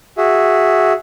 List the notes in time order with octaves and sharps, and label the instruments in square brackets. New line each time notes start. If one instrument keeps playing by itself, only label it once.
[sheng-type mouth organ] F#4 G#4 E5